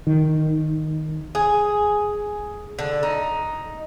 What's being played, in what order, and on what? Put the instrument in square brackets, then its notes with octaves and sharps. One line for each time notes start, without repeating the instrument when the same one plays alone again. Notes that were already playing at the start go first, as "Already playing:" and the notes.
[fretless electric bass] D#3
[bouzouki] G#4
D3
D#4